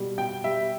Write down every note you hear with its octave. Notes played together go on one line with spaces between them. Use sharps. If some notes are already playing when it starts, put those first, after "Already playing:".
Already playing: B2 G3
B2 G5
G3 E5